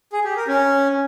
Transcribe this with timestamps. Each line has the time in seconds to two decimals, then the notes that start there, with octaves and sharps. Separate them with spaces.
0.13 G#4
0.24 G4
0.36 A#4
0.48 C#4